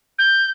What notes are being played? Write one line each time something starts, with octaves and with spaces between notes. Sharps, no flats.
G6